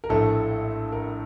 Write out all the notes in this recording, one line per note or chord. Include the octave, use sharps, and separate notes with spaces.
A#4
A#1 A2 A3 A4
A#4